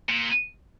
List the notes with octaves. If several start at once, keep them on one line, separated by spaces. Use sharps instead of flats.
A#2